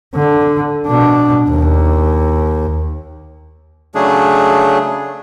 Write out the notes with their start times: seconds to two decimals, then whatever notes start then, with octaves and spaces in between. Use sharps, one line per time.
0.15 D3
0.87 B2 D4
1.49 D#2
3.95 C#3 F#3 A3 D4 G#4